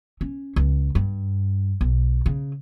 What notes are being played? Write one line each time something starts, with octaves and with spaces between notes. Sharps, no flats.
C#4
C#2
G2
B1
C#3